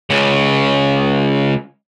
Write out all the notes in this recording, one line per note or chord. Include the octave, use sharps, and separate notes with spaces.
C#2 C#3